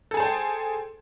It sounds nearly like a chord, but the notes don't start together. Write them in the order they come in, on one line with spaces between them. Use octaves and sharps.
A4 G#4 A5 C5 G5